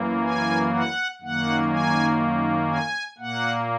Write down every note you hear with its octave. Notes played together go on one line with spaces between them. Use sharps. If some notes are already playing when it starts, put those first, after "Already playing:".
Already playing: F#2 E3 A#3
G#5
F#5
F#2 D#3 A#3 F#5
G#5
G#5
A#2 A#3 F#5